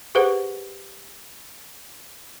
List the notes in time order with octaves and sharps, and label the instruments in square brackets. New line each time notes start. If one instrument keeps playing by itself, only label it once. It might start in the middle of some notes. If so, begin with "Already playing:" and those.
[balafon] G4 G#4 B4 C5 F#5